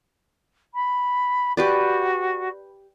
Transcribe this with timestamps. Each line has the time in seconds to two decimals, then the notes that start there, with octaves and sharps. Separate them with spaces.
0.74 B5
1.57 F#4 G4 B4 D5